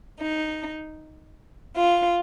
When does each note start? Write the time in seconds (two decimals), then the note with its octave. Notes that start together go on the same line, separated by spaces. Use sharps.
0.19 D#4
1.76 F4